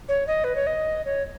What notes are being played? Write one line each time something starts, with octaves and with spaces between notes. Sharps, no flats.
C#5
D#5
B4
C#5
D#5
C#5